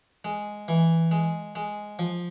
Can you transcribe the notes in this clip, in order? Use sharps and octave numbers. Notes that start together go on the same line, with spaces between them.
G#3
E3
G#3
G#3
F3